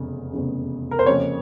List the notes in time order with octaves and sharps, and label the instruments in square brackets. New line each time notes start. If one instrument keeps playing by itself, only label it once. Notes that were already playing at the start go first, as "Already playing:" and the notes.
Already playing: [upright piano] F1 E2 C#3
F1 E2 C#3
A#4
C5
F2 C#3 F3 A#3 C#5